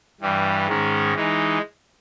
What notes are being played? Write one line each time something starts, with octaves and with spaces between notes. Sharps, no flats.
G2 E3 G3
G#2 D#3 G#3 C#4
E3 G#3 D#4